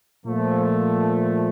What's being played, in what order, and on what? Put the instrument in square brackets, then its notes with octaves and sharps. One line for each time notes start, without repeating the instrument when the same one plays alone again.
[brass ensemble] A#2 F3 A3